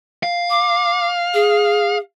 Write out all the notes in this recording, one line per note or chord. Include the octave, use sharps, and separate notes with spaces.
F5
D6
G#4